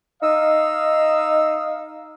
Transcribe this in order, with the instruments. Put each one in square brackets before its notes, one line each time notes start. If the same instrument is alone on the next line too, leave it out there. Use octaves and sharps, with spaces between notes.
[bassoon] D#4 [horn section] D#5 F5 [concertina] E6